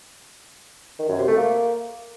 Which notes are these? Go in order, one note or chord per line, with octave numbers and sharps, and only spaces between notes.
D#3
F#2
C3
A3
A#3